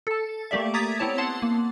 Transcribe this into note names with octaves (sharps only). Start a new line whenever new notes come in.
A4 A5
A3 A#3 G4 D5 E5
A#5 D6 D#6 G#6 A6 B6
B3 C4 E4 C#5 A5
F#5 A5 C6
A#3